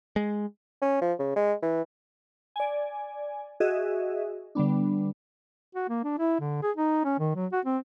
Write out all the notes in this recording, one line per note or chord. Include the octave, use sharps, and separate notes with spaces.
G#3
C#4
F3
C#3
G#3
E3
D5 G#5
F#4 G#4 D#5 E5
D3 G3 B3 D4
F#4
A#3
D4
E4
D3
G#4
D#4
C#4
D#3
F#3
F#4
C4